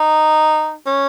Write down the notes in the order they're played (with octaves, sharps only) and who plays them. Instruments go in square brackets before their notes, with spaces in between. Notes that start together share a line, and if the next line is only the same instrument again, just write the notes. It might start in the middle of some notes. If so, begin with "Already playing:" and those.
Already playing: [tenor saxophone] D#4
C#4